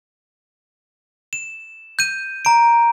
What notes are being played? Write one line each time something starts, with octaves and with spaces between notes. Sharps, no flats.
E7
G6 D#7
A#5 D7